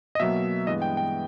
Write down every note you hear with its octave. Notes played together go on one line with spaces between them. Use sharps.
D#5
B2 F#3 A#3 E5
G2 E3 G#3 B3 D#5
G5
G5